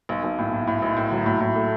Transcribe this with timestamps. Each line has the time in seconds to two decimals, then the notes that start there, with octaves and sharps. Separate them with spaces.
0.09 B1
0.24 B1
0.38 A2
0.53 A2
0.67 A2
0.82 B1
0.96 A2
1.12 F#3
1.26 A2
1.40 A2
1.55 A3